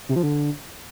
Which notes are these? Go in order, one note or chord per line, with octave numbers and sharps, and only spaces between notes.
C3
F3
D3